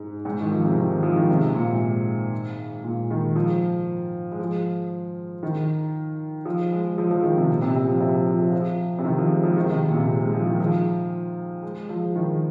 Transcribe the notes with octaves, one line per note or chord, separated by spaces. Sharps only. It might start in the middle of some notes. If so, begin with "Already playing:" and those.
Already playing: G#2
G#2
D#3
F3
C3
D#3
G#3
F3
D#3
C3
C3
A#2
G#2
A#2
D#3
F3
G#3
F3
D#3
F3
G#3
F3
F3
D#3
C3
A#2
C3
C3
F3
C3
F3
F3
F3
F3
C3
D#3
F3
G#3
F3
D#3
C3
D#3
A#2
C3
G#3
G#3
F3
D#3
F3
G#3
F3
D#3